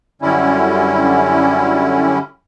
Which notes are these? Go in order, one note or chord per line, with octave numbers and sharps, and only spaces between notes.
F#2 D3 G3 C#4 E4